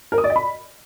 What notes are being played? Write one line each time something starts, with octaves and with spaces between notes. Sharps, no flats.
A#4
D#6
D5
D#5
B5